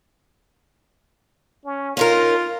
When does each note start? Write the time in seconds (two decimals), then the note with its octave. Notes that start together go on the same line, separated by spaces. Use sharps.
1.65 C#4
1.97 C#4 D#4 F4 A#4